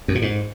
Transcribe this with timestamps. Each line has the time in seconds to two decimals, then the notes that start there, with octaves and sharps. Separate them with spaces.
0.08 F#2
0.15 A#2
0.22 G#2